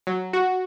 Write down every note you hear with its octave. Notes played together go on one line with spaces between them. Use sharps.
F#3
F#4